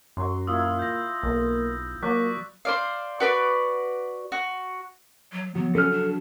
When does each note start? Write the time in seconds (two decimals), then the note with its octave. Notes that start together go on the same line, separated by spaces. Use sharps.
0.17 F#2 F#3 C6
0.47 A#2 E4 F4 D#6 E6
0.79 G6 A#6
1.23 B1 A#3
2.03 F#3 A#3 D5 C#6 F#6 B6
2.65 C5 D5 F5
3.20 F#4 B4 D5
4.32 F#4
5.32 F#3
5.55 F#3 B3
5.75 C#4 A4 F6
5.91 D4